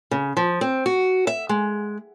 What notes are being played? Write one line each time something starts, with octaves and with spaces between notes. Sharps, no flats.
C#3
F3
C4
F#4
E5
G#3